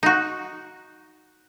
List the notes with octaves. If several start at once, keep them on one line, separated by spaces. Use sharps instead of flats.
D#4 F#4